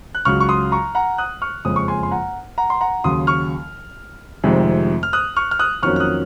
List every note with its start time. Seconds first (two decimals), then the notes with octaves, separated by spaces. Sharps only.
0.15 F#6
0.25 C#2 C#3 F#3 C#6 F6
0.40 C#6
0.49 C6 D#6
0.72 A#5 C#6
0.95 F#5 A#5
1.18 D#6 F#6
1.42 C#6 F6
1.65 F#1 F2 C#3 G#3 C#4 D#6
1.76 C#6
1.88 G#5 C6
2.03 C6
2.11 F#5 A#5
2.58 F#5 A#5
2.70 C6
2.81 F#5 A#5
3.04 D#2 C#3 F#3 C6 D#6
3.27 C#6 F6
4.44 F1 F2 C3 D#3 G#3
5.03 F6
5.13 D#6 F#6
5.37 C#6 F6
5.51 F6
5.59 D#6 F#6
5.83 F2 D#3 F#3 A#3 C#4 C#6 F6
5.96 F6
6.00 D#6 F#6